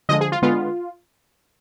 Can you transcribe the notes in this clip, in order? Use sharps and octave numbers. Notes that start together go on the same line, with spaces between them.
D3 F3 G#3 D#5
G#4
F4
D3 G#3 B3 F4